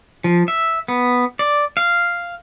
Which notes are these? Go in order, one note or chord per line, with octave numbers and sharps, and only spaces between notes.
F3
E5
B3
D5
F5